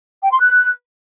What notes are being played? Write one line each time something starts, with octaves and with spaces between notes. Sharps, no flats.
G5
C6
F#6